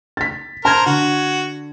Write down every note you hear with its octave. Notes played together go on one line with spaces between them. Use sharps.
A6 B6
A#4 C5 A5 A#5 G#6
D3 F#4